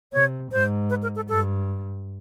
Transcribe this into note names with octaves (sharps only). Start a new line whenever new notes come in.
C3 C#5
G#2 C5
B4
A#4
A4
G2 A4